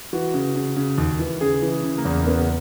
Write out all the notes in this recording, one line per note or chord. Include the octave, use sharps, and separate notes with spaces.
E3 F#4
C#3
C#3
C#3
D#2
E3
C#3 G#4
E3
C#3
A#3
E2
C#3 B3